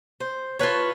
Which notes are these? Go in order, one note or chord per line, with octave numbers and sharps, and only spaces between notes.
C5
F4 A4 B4 C#5